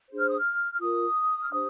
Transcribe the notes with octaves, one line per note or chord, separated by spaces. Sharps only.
D4 G#4 C5
F6
D#6
F6
F6
F4 A#4 D#6
F6
D4 G4 C5 D#6